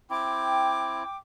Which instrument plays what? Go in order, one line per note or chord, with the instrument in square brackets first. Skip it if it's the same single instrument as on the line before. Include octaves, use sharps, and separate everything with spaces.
[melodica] C4 E4 [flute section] G5 D6